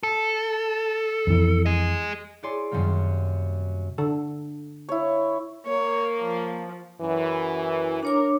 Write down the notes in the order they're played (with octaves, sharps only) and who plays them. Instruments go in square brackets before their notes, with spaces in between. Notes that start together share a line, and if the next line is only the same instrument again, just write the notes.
[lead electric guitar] A4
[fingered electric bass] F2 E3
[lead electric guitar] G#4 D#5
[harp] E4 G#4 C#5 D5 G#5 C6
F#2 C3 D#3 G3 A#3
[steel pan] D3 A4
[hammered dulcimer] E4 C#5
[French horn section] A#3 [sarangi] C#5
[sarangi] F3
[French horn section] F#2 E3
[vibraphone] D4 C#5 D6 [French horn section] A#4